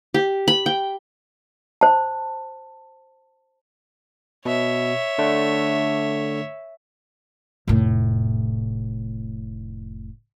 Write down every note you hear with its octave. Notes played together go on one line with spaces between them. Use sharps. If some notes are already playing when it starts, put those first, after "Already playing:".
G4
B5
G5
C5 A5
B2 C#5 E5
D3 A3 D4
F1 A2